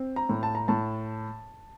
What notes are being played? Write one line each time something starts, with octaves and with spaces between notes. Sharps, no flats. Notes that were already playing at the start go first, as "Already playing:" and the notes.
Already playing: C4
A#5
A2
A5
A#5
A2 A5